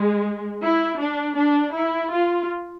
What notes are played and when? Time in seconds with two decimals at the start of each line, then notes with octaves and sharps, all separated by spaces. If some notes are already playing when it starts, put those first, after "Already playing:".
Already playing: G#3
0.63 E4
0.99 D4
1.37 D4
1.75 E4
2.13 F4